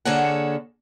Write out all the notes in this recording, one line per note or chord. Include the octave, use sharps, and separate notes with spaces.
D3 A#3 G#4 A4 C#5 F#5